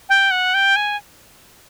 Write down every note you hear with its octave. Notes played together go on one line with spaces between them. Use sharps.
G5
F#5
G5
G#5